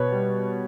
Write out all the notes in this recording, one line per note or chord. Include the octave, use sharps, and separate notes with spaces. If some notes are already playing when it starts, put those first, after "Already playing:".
Already playing: B2 B4 C#5
G3